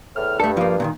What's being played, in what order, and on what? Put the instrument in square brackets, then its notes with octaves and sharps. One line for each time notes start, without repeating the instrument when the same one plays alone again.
[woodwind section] E2 A2 F6
[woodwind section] G2 [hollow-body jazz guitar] A3 A4
[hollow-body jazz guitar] F3 A#3
A#2 D3 D#3